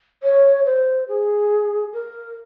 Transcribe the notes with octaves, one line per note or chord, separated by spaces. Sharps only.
C#5
C5
G#4
A#4